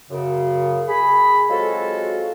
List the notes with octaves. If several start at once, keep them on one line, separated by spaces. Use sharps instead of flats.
F#2 C#3
G#4 B5
F#3 G#3 C4 F4 F#4 A4